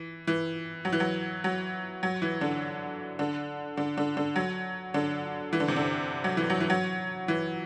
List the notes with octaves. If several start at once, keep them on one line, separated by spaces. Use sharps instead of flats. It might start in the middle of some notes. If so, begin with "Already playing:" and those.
Already playing: E3
E3
F#3
E3
F#3
F#3
F#3
E3
D3
D3
D3
D3
D3
F#3
D3
E3
D3
C3
D3
F#3
E3
F#3
E3
F#3
E3